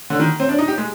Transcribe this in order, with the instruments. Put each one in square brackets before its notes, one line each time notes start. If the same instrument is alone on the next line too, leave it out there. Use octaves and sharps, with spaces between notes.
[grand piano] D3
D#3
C4
D4
D#4
G4
G#3